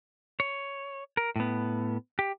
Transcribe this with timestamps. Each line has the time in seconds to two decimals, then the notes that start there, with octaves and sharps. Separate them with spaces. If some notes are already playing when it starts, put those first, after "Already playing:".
0.40 C#5
1.17 A#4
1.36 A2 B3
2.19 G4